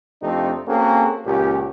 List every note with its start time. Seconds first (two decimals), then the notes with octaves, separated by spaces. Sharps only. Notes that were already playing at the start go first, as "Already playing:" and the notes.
0.23 F2 C3 A3 C4 D4 D#4
0.67 A#3 C4 C#4 F#4 G#4 A4
1.25 C#2 A#2 C#4 G4